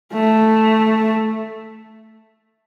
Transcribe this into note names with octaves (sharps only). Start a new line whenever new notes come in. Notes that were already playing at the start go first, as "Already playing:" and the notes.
A3